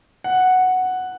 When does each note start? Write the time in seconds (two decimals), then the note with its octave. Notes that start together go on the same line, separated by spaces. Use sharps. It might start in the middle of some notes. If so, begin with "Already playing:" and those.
0.24 F#5